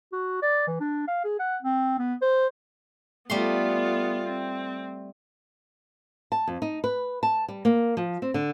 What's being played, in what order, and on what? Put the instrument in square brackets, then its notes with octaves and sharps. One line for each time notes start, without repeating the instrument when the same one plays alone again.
[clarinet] F#4
D5
E3
D4
F5
G#4
F#5
C4
B3
C5
[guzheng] G3 A3 C6 [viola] B3 F4
[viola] C4
[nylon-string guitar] A5
F2
D#4
B4
A5
G3
A#3
F3
C4
D3